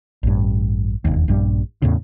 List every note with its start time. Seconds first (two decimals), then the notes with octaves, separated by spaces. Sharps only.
0.23 A1 G2
1.05 E1 D#2
1.28 A#1 G2 G3
1.82 E2 A2 C#3